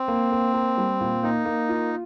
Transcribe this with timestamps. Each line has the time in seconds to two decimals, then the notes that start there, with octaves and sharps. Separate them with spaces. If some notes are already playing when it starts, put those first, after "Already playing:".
Already playing: C4
0.08 A#3
0.32 A#3
0.54 A#3
0.78 G3
1.01 A#2
1.23 A#3 D#4
1.45 A#3
1.69 F4